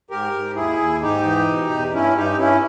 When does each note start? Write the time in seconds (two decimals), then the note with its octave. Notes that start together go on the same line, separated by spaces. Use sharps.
0.10 G#2 G4 A#4
0.33 G#2
0.56 D#2 E4 G#4
0.79 D#2
1.02 G#2 D#4 G4
1.24 E3
1.48 B2
1.70 E2
1.93 G2 C#4 E4
2.16 G2 D#4 G4
2.39 G2 C#4 E4